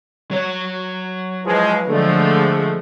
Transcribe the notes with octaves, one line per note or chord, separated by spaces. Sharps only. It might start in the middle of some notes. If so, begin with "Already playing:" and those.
F#3 C#5
E3 F3 G#3
D3 F3 G#3 A3